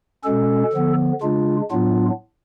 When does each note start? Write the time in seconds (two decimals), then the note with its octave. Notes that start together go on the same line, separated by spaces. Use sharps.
0.24 B2 G#3 C#4 A4
0.73 D3 F3 B3
1.22 C#3 G#3 D4 F4
1.70 A2 F#3 B3 D4 F4